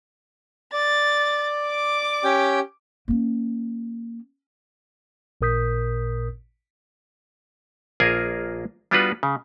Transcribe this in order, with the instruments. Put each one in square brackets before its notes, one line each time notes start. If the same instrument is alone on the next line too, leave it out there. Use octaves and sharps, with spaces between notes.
[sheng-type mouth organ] D5 [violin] A6
[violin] D6
[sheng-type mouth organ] C#4 G4 G5
[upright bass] A#3 C#4
[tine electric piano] A1 A#2 A#4 D#6 G6 B6
[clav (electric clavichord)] A#1 A#3 F4 G#4 A#4 G#5
G3 B3 D4 F4 F#4 B4
C#3